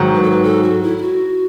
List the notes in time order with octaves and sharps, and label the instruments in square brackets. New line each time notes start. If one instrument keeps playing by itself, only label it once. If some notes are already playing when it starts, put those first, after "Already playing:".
Already playing: [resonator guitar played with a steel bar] G#2 D#3 F#3
[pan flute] B4
A4
B4
A4
F#4
E4
E4
F#4